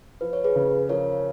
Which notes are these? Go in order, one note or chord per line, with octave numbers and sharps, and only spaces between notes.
F3 B4
C#5
G#4 B4
C#3
F3 A#4 C#5